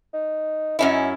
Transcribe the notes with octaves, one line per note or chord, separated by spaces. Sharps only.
D#4
F#2 C#4 D#4 E4